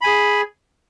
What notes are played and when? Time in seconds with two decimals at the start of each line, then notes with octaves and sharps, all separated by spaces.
0.01 B5
0.04 G#5
0.07 G#4